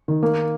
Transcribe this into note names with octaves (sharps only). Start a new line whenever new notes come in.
D#3
A#3